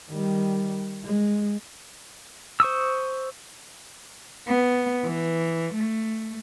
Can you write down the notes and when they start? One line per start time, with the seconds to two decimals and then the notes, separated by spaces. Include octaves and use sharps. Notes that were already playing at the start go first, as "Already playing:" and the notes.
0.11 D#3 G3
1.05 G#3
2.60 C5 C#6 D#6 E6
4.47 B3
5.04 E3
5.75 A3